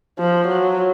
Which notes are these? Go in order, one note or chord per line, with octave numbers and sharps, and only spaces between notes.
F3
F#3